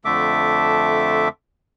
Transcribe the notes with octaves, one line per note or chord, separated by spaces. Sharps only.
F2 D3 A3 A4 E5 D6